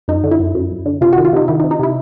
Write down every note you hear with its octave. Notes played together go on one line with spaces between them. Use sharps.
F#2 D#4
D3
E4
F#2
F#2
F#2
D3
C3 F4
F#4
D#3
F4
C3 D#4
D#3 E4
D#4
C3
D#4
C3 E4